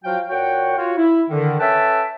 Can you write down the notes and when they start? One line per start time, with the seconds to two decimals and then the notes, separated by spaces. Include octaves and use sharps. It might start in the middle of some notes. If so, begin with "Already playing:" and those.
0.04 F3 F#3 F#4 F5 G5
0.29 A#2 F#4 C#5 F#5 G5
0.77 F4 F#4 C#5
0.96 E4
1.30 D3 D#3
1.59 C#4 A4 B4 E5 G5 A5